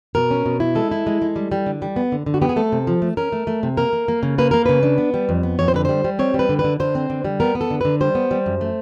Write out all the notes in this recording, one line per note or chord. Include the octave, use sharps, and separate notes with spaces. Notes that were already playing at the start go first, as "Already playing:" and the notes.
B2 A#4
C#4
B2
E4
G#3 A4
E4
G#3
G#3
G3
G3
D3
G3
B3
D3
D3
F#4
B3 G4
G#4
A3 A4
C3
F3
A3
C#4 A#4
A3
A3
C3
A#3 A#4
A#3
A#3
C#3
A#3 B4
A#3 A#4
C#3 B4
D4
B3
G3
F2
B3
F2 C#5
C5
D3 B4
G3 C5
G3
C4 C#5
G3
B4
D3
B4
D3
D3 C5
C4
D3
G3
B3 A#4
B3
A4
D3
D3 B4
G3 C5
B3
G3
F#2
A3